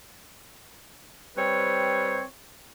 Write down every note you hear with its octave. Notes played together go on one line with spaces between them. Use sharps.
G3 C4 B4 C#5